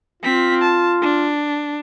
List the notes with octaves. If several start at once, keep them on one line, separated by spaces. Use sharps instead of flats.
C4 F4 B6
A5
D4